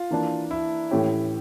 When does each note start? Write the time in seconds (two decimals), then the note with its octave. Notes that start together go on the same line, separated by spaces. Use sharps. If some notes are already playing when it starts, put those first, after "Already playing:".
Already playing: F4
0.11 E3 A#3 D4
0.51 E4
0.91 A2 E3 A3 C#4 G4